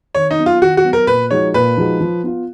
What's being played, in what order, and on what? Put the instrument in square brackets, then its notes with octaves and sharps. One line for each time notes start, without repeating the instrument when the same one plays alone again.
[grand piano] D#3 [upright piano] C#5
[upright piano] D#4
[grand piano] F#3 B3
[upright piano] F4
[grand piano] D#3 [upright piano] F#4
[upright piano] F#4
[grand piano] F#3 B3
[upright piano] A#4
[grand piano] A#2 [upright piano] B4
[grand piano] F3 G#3 D#4 F#4 [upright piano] C#5
[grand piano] A#2 [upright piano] B4
[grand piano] F3 G#3 D#4 F#4
F3
B3 F4